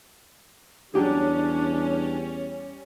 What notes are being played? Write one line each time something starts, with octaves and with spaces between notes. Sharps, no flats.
E2 F#3 G3 C#4 D4 G4 G#4